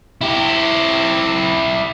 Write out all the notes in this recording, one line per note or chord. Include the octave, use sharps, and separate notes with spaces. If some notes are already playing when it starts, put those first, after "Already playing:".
E4 G4